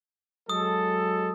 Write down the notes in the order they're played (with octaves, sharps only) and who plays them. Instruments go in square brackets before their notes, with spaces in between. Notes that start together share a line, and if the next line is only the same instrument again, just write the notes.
[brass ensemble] F#3 G#3 A4 [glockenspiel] D#6